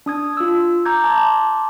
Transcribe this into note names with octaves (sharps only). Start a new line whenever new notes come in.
D4 D#6 G#6
F4 E6
A#5 D6 G6 G#6
A5 C6 D6